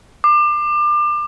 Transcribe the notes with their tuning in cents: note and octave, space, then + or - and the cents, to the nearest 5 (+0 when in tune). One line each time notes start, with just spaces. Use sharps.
D6 +30